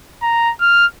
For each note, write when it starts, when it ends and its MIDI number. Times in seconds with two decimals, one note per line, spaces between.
0.22 0.52 82
0.61 0.86 89